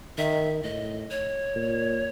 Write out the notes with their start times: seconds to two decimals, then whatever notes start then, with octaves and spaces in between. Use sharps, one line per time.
0.18 D#3 E5
0.64 A2 D#5
1.11 C#5
1.56 A#2